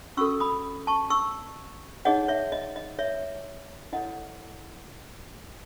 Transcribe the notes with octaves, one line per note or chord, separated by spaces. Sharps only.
C#4 F#4 A4 C#6 E6
B5 D#6
A5 C#6
C#6 E6
D#4 G#4 C#5 D#5 F#5
C#5 E5
D#5
D#5
C#5 E5
E4 A4 C#5 D#5 F#5